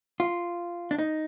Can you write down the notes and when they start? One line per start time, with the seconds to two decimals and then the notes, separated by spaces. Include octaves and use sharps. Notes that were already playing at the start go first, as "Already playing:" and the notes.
0.20 F4
0.91 D4
0.98 D#4